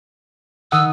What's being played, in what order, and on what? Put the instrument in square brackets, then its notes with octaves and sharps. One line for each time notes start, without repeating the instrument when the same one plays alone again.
[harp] D#3 [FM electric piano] F#5 D#6 [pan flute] E6